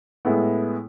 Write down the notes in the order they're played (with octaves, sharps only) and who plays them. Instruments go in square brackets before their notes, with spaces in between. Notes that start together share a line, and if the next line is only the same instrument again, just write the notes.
[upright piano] A2 G#3 B3 E4